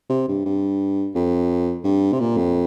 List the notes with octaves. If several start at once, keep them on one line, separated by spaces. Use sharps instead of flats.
C3
G2
G2
F2
G2
C3
A#2
F2